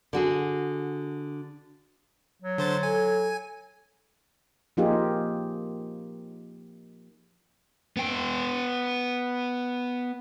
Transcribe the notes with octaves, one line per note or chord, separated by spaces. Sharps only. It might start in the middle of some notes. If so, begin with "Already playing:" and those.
D3 F#4 G#4
F#3
D3 C5 A6
A4 G#5
F3 A#3 D#4 F4 G4 G#4
B3 G5